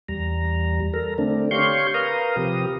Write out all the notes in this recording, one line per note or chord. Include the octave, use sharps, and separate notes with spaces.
E2 G3 A#5
A4 A#4 A#5
D3 A3 C4 D4
G4 C#5 F5 C6 C#6 G6
A#4 B4 F5 A#5 D#6
C3 F3 G4 D#6